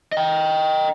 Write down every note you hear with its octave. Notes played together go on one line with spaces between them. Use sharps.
D#5 G5